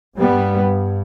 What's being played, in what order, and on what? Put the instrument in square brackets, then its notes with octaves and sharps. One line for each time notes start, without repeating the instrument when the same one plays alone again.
[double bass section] G2 G3 B3